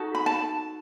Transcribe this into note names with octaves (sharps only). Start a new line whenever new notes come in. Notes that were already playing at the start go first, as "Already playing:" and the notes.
Already playing: D#4 F#4 A4
B5
A5